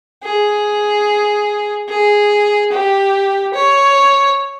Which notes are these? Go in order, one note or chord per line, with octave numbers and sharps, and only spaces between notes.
G#4
G#4
G4
C#5